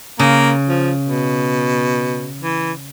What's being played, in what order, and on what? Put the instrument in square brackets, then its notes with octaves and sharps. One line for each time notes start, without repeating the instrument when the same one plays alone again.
[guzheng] C#3 [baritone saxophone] A#3
[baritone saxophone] F3
B2
E3